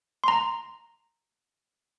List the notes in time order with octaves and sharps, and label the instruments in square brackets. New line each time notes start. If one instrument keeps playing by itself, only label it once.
[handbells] A#5 C6